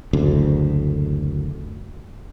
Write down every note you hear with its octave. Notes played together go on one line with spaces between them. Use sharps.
F#1 D2